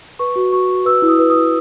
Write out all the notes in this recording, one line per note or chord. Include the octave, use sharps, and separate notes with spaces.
B4 C#6
F#4
F#4 C#6
F#4
B4 E6
E4
D#6
B4
D#6
E4